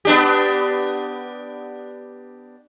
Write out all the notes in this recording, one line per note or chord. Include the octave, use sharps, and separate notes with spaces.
B3 D4 G4